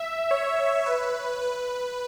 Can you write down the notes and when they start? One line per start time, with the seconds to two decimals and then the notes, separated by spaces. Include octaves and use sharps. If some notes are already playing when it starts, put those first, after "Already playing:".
Already playing: E5
0.31 C#5
0.86 B4
1.42 B4